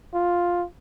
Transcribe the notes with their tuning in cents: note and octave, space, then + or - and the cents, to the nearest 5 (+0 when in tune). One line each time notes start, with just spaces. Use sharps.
F4 +5